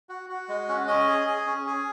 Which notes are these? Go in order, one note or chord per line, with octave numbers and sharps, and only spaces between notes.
F#4
F#4
G#3
C#4
C#4 D#5
G#4
G#4
C#4
G#4